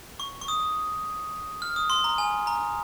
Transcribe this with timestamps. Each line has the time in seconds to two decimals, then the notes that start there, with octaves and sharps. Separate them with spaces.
0.20 C#6
0.41 C#6
0.48 D#6
1.62 F6
1.76 D#6
1.90 C6
2.04 A#5
2.18 G#5
2.47 A#5